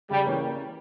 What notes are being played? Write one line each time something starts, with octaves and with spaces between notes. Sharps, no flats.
C#3 G3
E3 A#3 C#4